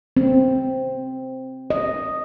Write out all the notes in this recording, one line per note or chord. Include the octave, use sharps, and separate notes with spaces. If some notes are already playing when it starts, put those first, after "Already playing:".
C4
D#5